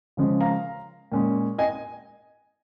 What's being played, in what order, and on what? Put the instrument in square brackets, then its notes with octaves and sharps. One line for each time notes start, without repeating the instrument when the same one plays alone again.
[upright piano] C#3 F3 G#3 C#4
F5 A#5
A#2 G#3 C#4
D#5 G#5